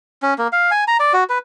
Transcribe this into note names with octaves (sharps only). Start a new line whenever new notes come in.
C#4
A#3
F5
G#5
A#5
D5
F#4
B4